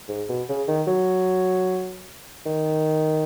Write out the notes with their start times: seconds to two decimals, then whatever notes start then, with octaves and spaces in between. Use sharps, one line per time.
0.08 G#2
0.29 B2
0.49 C#3
0.68 D#3
0.87 F#3
2.46 D#3